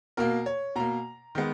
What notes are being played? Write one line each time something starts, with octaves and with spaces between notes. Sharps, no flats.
B2 A#3 A#4
C#5
B2 A#3 A#5
D#3 G#3 B3